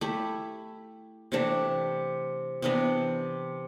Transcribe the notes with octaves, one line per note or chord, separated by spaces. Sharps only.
A3 E4 G4
C3 E3 A3 D4
C3 E3 B3 D4